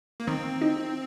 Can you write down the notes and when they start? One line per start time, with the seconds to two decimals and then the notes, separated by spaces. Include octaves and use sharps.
0.20 A#3
0.27 D#3 C4
0.61 D#4